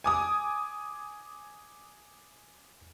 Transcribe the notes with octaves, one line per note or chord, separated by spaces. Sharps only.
G#5 D6 D#6